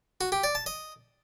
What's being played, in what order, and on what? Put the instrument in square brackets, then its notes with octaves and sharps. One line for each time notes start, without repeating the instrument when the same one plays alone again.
[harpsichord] F#4
G4
D5
A5
D#5